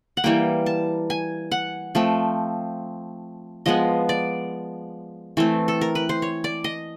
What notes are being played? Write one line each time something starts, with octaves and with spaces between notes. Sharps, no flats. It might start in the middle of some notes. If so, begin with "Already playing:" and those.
F#5
E3 G3 A#3 G5
A5
G#5
F#5
F3 A3 C4
F3 G#3 B3 D#5
D5
E3 A3 C4
A4
A#4
B4
C5
C#5
D5
D#5